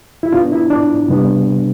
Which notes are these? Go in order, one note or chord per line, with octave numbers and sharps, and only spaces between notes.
E4
B2 B3 D4 F4
E4
D4
C3 G3 B3 D4